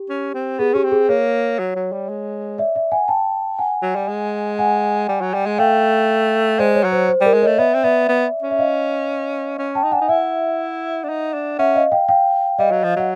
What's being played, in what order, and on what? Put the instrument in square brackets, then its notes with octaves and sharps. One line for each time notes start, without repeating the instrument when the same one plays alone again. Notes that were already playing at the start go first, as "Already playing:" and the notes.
Already playing: [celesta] G4
[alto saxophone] C#4
C4
[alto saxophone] B3 [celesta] G#4
[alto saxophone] C#4 [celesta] G4
[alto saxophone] C4
[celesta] G#4
[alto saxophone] A#3 [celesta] C#5
[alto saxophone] F#3
F#3
G3
G#3
[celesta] D5 E5
D5 E5
F#5 G#5
G5 A5
F#5 G#5
[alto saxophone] F#3
G3
G#3
[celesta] F#5 G#5
[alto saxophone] G3
F#3
G3
G#3
[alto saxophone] A3 [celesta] F5 G5
[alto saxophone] G#3 [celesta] C5 D5
[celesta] C#5
[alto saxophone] F#3
[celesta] C5
C5
[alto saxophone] G3 [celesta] A#4
[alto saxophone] G#3
[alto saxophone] A3 [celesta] C#5 D#5
[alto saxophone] B3 [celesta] D5 E5
[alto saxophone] C4
[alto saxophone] B3 [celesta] D5 E5
[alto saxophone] B3
C#4
[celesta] E5
D#5 F5
[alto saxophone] C#4
[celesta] G5 A5
[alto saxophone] D#4
[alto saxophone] D4 [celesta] F#5 G#5
[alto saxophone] D#4
[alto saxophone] E4 [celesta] E5 F#5
[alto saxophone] D4
D#4
D4
[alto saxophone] C#4 [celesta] E5 F#5
[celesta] D#5 F5
F5 G5
F5 G5
[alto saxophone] G3 [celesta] D#5 F5
[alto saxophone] F#3
F3
[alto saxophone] F#3 [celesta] F#5